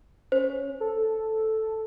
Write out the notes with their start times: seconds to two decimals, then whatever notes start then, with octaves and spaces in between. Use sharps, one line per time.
0.32 C#4 C5
0.80 A4